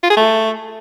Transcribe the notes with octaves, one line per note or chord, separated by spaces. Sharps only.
F4
G#4
A3